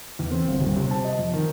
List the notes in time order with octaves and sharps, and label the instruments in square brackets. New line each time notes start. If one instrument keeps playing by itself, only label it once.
[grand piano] E2
C4
G1
D#1
C3
A5
D#5
F2
D#3